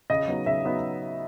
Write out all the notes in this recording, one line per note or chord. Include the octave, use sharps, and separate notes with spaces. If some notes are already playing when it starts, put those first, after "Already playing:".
C#3 D#5
F#3 B3 D#4
C#3 E5
F#3 B3 D#4